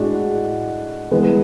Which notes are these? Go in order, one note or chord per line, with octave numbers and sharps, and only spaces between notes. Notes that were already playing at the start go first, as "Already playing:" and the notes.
Already playing: A2 G#3 D4 F#4
E3 G#3 B3